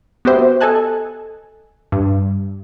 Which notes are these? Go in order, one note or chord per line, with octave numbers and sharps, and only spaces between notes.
B3 F#4 G4 C5 E5
A4 D#5 G#5 A5 F#6
G2